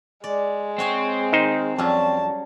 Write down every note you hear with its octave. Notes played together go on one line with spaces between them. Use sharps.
G#3 D5
C4 G#4 C#5 F#5
D#3 D#4 C5
F2 F#3 G3 C#4 A5